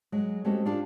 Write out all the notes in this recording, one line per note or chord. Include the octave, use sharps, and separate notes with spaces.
F#3 G#3
G#3 A3 C4 C#4 F#4 G4
D4 F4 G4